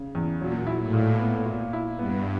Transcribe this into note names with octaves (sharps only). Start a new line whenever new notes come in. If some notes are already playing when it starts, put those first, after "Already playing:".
Already playing: C#3
E2
A#2 F#3
E4
A2
A#2
B3
A#2
E4
G2 B3